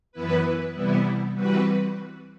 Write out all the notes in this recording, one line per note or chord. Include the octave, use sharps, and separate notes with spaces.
F#2 E3 B3 E4 B4
C3 E3 G3 B3 E4
E3 G3 C4 F#4 B4